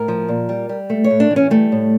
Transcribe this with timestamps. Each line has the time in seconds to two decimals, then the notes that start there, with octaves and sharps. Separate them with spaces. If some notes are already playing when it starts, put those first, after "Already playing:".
Already playing: A2 A#4
0.08 F3
0.29 A#2
0.49 G3
0.69 G3
0.90 A3
1.04 C#5
1.11 A2
1.20 D4
1.31 E3
1.36 C#4
1.50 G3 A3
1.72 A2